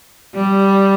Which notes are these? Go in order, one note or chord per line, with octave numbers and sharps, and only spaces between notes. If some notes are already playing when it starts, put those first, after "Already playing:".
G3